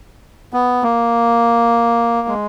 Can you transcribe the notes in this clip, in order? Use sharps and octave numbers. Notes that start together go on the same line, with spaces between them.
B3
A#3
G#3